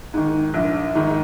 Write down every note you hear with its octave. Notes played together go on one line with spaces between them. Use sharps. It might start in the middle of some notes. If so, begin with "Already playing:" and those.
G#2 D#3
A#1
G#2 D#3